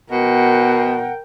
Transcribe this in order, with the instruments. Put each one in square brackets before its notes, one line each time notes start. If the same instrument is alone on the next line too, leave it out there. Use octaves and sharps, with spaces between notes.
[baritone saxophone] B2 [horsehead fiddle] A#4 G5 [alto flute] F#5